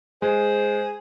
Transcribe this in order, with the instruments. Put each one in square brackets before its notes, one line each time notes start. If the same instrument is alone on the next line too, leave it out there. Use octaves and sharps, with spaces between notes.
[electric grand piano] G#3 [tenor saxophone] G#4 [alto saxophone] C5